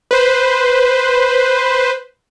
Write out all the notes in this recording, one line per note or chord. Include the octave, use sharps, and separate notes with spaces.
B4 C5